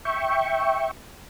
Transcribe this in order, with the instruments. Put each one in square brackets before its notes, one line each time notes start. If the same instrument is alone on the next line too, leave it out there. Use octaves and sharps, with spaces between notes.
[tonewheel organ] E5 G5 C#6